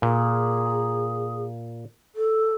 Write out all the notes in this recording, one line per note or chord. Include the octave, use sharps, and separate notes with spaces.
A#2 G#4
A4